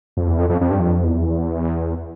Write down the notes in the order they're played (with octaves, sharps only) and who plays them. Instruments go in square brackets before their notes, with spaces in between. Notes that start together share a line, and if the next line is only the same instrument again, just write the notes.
[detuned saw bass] F2
E2
F2
F2
F2
G2
F2
E2